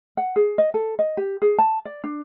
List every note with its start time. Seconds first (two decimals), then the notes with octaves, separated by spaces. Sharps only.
0.17 F#5
0.36 G#4
0.58 D#5
0.74 A4
0.99 D#5
1.17 G4
1.42 G#4
1.58 A5
1.85 D5
2.04 D4